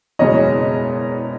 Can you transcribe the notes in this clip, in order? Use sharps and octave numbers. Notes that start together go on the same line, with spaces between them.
F#1 E2 B2 G#3 C#5 D#5